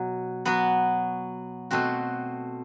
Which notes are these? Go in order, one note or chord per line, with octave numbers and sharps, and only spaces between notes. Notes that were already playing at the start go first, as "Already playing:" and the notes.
Already playing: B2 F#3
F#3 B3 F#4
B2 A3 C4 F#4